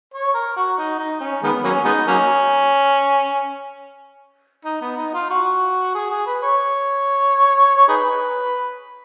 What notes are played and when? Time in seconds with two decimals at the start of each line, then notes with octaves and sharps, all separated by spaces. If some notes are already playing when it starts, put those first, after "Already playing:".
0.14 C#5
0.34 A#4
0.56 F#4
0.78 D#4
0.99 D#4
1.21 C#4
1.43 D#3 G#3 B3
1.64 F#3 A#3 C#4
1.85 G#3 B3 D#4
2.08 F#3 A#3 C#4
4.65 D#4
4.82 B3
4.97 D#4
5.14 F4
5.30 F#4
5.95 G#4
6.11 G#4
6.26 B4
6.43 C#5
7.77 C#5
7.88 D#4 G#4 B4